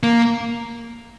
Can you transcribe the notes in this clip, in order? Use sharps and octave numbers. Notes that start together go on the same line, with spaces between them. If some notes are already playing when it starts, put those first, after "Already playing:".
A#3